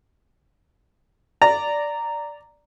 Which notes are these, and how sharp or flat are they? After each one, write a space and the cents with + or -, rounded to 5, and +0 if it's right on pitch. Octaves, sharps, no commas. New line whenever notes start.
D5 +0 A#5 -10